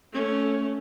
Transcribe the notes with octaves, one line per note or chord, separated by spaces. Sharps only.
A3 C#4